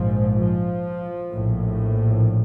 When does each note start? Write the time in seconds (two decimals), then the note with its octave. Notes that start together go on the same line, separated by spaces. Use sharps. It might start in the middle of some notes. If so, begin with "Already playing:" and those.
Already playing: A#1 G#2 F3
0.38 F3
1.32 A#1 A2